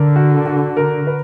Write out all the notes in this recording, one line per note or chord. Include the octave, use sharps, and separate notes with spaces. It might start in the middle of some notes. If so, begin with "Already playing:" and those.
Already playing: D3 A#4
F#4
F#4
A#4
B4